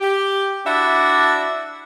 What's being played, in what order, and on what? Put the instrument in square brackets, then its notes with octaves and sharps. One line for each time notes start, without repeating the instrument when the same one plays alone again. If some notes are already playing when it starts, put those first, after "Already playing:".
[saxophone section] G4
[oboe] D4 [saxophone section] E4 F#4 E5